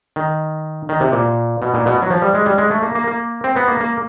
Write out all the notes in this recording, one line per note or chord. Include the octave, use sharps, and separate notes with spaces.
D#3
D#3
C3
A#2
B2
A#2
B2
F#3
F3
G3
G#3
G3
G#3
A3
A#3
A#3
A#3
C4
B3
A#3
A#3